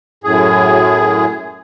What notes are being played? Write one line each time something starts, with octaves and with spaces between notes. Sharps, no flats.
F#2 A2 G#4